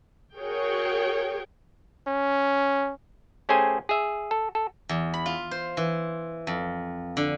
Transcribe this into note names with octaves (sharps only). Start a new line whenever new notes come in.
F#4 G#4 A#4 C#5 G5
C#4
A3 C#4 G4 G#4 C5 G#5
G#4 E5
A4
A4
E2
B5
F4
C5
E3
F2
D3